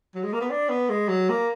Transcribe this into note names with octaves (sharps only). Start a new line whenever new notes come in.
F#3
G#3
A#3
B3
D4
B3
G#3
F#3
A#3